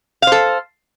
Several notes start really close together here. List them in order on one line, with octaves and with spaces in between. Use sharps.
F5 C5 A4